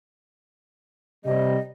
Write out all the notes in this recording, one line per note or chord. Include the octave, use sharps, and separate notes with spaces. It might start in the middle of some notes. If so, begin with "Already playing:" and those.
C3 G3 D#5